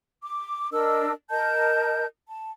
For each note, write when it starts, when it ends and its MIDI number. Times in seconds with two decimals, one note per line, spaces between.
0.22 0.68 86
0.71 1.11 62
0.71 1.11 70
0.71 1.11 75
0.71 1.11 88
1.30 2.05 70
1.30 2.05 75
1.30 2.05 81
1.30 2.05 91
2.28 2.51 81